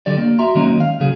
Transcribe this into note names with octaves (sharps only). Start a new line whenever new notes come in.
D3 F#3 G4 D5
A#3
F#4 E5 A#5 C6
D#3 F#3 G#3 A#3 C#4 D#4
F5
C#3 F#3 G#4